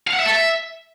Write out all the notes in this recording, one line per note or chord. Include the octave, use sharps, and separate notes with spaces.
F5
F#5
E5
A4
E5